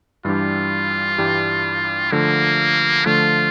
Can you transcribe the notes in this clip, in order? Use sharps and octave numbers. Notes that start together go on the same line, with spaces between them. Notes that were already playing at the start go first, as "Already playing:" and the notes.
G2 E3 G3 D4 F4 G4
G2 E3 G3 D4 G4
D3 F3 A3 A#3
D3 F3 A3 F4